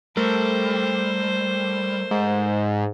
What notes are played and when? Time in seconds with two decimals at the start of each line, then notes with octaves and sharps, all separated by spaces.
0.17 G3 A3 A4 A#4 C5
2.11 G#2